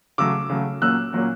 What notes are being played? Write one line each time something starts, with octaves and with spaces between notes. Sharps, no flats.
C#3 F#3 A3 D6 E6
C#3 F#3 A3
A#2 F#3 A#3 C#4 E6 F#6
A#2 F#3 A#3 C#4